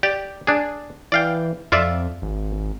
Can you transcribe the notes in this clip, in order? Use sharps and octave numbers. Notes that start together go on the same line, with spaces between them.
G4 D5
D4 G#4
E3 D5 F5 G5
F2 F4 D5 E5
G#1